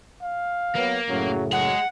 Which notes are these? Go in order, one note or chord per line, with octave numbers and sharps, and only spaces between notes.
F5
F#3 A#3 B3
F#2 A2 C#3 F#3
F#3 G#4 D#5 F#5